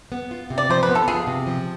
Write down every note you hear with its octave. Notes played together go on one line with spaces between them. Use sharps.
B3
F4
C3
D5
F3 C5
B4
B3
A4
F4 G#4
C3
F3